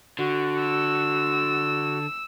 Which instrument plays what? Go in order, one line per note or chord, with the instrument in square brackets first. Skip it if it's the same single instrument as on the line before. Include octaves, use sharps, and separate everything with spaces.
[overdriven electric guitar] D3 [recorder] F#4
[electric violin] E6